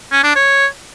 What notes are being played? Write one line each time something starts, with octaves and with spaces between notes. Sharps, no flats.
C#4
D4
C#5